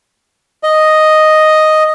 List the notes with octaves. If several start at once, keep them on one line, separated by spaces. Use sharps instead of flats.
D#5